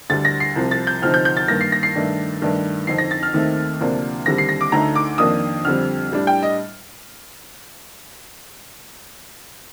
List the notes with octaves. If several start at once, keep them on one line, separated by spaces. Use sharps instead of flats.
D2 D3 G3 A6
A#6
C7
C2 C3 F3
A6
G6
D2 C3 F3 C4 D#4 F6
G6
G6
A6
G2 D#3 A#3 A#6
C7
A#6
C7
G2 D#3 A3 D4
G2 D#3 A3 D4
F2 D3 F3 C4 D#4 C7
A#6
A6
F6
D#2 D#3 A3 C4 D#4
D2 C3 F3 A#3 D4
D#2 D3 G3 C4 A#6
C7
A#6
D6
D2 D3 A3 D#4 A#5
D6
F2 D#3 A#3 D4 D#6
F2 D3 G3 C4 F6
A2 G3 D4
G5
D#5